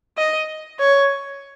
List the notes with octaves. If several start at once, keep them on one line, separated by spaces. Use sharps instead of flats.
D#5
C#5